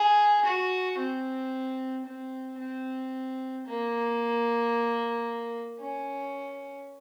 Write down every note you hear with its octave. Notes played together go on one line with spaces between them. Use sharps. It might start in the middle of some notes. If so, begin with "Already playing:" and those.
Already playing: G#4
F#4
C4
C4
C4
A#3
C#4